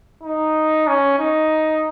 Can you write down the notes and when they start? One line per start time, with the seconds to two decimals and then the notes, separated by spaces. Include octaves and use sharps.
0.23 D#4
0.87 C#4
1.19 D#4